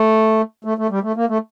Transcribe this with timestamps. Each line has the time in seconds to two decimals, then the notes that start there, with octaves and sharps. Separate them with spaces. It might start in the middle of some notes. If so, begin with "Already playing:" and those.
Already playing: A3
0.65 A3
0.78 A3
0.90 G3
1.03 A3
1.16 A#3
1.29 A3